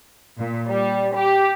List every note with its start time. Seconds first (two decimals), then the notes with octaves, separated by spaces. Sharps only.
0.38 A#2
0.69 G3
1.16 G4